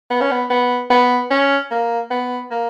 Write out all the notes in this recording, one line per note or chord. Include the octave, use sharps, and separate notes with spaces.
B3
C#4
B3
B3
B3
C#4
A#3
B3
A#3